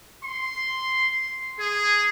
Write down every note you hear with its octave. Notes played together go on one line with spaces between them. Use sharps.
C6
G#4